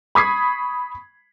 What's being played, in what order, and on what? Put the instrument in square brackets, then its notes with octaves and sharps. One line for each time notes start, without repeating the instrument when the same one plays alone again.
[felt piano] B5 C#6 D#6 G#6 B6 C7